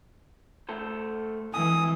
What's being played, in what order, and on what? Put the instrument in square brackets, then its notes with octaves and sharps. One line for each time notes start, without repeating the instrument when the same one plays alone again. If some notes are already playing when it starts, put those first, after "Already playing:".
[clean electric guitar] A3 A4 C5
[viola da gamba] E3 [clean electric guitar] G#3 C4 G#5 [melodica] D#6